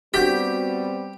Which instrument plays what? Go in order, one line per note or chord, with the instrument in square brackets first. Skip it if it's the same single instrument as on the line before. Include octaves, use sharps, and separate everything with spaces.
[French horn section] G3 B3 C4 [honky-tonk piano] F#4 G6 B6 [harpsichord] G4